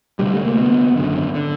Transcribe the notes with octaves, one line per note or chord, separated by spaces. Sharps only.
D2 C3 G3
A3
A#3
D2 C3 B3
G#1 F#2 D3
D3